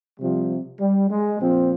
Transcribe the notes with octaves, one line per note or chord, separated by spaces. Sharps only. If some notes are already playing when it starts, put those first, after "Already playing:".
C3 F3 G3
G3
G#3
A#2 F3 C4